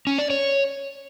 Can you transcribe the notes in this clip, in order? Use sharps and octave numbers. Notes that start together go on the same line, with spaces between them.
C#4
D5
C#5